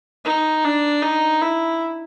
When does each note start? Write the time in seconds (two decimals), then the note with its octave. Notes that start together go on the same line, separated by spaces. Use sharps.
0.25 D#4
0.65 D4
1.03 D#4
1.41 E4